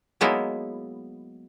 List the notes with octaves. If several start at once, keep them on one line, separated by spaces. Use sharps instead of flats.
F#3 G#3 A#3 B3 D#4 E4